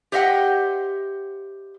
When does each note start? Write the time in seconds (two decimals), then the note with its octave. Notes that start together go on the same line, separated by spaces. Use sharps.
0.12 G4 C5 D#5 E5 F#5 G5